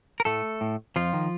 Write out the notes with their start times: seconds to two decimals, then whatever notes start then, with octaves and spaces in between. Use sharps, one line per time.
0.20 A#4
0.25 A2 A3 A4
0.61 A2
0.96 F2 F3 F4
1.13 D#3